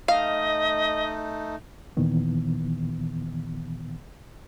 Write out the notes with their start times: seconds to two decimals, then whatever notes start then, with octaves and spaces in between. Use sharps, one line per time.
0.08 A3 D#4 D#5 F5
1.97 D#2 A#2 D#3 E3 B3